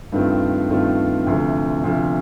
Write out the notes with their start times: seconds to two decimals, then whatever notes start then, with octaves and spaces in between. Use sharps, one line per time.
0.12 G2 D#3 A3 C4 F4
0.70 G2 D#3 A3 C4 F4
1.27 D2 C3 F3 A3
1.84 D2 C3 F3 A3